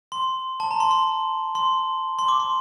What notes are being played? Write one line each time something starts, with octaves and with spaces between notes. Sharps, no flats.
C6
A5
A#5
C6
C6
C6
C6
D6
C6